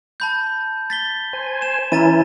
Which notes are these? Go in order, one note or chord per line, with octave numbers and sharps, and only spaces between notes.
A5 B5 G6
A6 B6 G7
C5 G#5
E7
E3 C#4 E4 A#5 A6 D#7